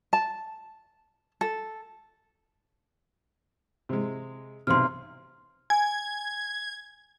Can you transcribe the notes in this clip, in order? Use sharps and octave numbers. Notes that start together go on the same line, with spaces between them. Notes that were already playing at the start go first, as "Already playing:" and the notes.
A5
A4
C3 G#3
B1 C3 C6 F6
G#5 G#6